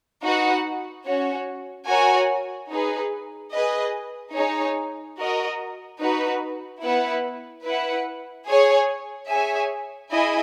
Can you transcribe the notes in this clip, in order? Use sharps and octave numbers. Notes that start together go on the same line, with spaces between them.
D#4 F#4 B4 F#5
C#4 F#4 C#5
F#4 A#4 C#5 G#5
D#4 G#4 B4
G#4 B4 D#5
D#4 G#4 C#5
F#4 A#4 D#5
D#4 F#4 B4
B3 E4 B4 F#5
E4 B4 F#5
G#4 C#5 G#5
G#4 C#5 E5 G#5
E4 G#4 D#5 G#5